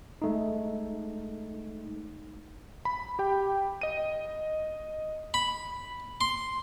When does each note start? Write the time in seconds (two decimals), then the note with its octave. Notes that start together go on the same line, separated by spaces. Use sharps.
0.22 G#3 A3 D#4
2.85 B5
3.19 G4 G5
3.81 D#5 D#7
5.34 B5
6.21 C6